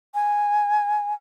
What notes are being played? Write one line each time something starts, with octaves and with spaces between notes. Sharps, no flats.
G#5